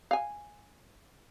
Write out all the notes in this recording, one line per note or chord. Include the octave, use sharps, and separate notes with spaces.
F5 G#5